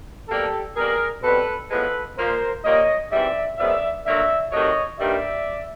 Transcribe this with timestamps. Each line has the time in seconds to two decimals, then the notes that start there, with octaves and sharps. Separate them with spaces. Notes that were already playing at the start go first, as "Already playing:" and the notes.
0.29 B2 G3 A#3 G4 A4
0.76 B2 G3 A#3 G#4 A#4
1.23 B2 G3 C4 A4 B4
1.70 A2 F3 G#3 B3 A4 B4
2.17 A#2 F3 A#3 A#4 C5
2.64 A#2 G3 A#3 C#5 D#5
3.11 G#2 E3 G3 C4 D5 E5
3.58 F#2 C#3 F3 G#3 B3 D5 E5
4.05 D3 F#3 A#3 D5 E5
4.52 C3 D#3 F#3 A3 C#5 D#5
4.99 G2 D#3 G3 A#3 D5 E5